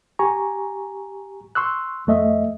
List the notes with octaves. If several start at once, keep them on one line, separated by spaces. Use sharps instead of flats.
G4 G#5 A#5 C#6
C6 C#6 E6 F#6
F2 A3 D#5 E5